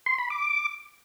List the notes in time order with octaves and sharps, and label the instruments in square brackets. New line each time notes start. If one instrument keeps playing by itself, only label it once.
[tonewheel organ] C6
B5
D6